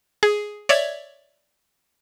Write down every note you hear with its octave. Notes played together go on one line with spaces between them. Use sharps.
G#4
C#5 D5 E5 G#6